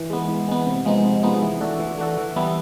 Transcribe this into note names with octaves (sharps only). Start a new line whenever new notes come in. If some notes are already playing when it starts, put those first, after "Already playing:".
Already playing: E3
G#3 B3
E3
G#3 B3
C3
F3 G#3 B3 D#4
C3
F3 G#3 B3 D#4
E3
A3 D4 F#4 A4
E3
A3 D4 F#4 A4
E3
G3 B3 E4 A4